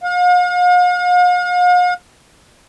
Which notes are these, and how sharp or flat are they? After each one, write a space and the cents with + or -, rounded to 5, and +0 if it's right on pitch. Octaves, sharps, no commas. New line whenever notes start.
F5 +45